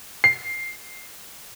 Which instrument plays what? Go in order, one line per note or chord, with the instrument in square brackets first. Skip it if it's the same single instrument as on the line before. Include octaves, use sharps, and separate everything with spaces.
[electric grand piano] C7